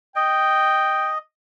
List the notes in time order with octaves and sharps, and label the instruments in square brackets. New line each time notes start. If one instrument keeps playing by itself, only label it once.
[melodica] D#5 [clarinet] G5